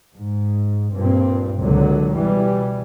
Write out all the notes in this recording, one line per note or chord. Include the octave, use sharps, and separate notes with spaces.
G#2
G2 A#2 C4
C#2 A#2 D3 F#3
B2 E3 G3